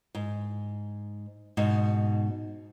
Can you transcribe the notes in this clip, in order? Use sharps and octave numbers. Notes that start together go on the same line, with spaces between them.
G#2
G#2 B2 D#4